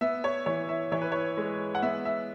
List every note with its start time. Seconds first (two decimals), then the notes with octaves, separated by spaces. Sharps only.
0.01 B3 E5
0.24 C#5
0.46 E3 C#5
0.69 E5
0.92 E3 C#5
1.02 B4
1.12 C#5
1.37 G#3
1.75 F#5
1.82 B3 E5
2.05 E5